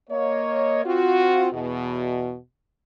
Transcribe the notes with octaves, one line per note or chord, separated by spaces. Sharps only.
A#3 C#5 D#5
C4 F4 F#4
E2 B2